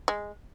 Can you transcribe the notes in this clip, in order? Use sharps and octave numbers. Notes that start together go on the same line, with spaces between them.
G#3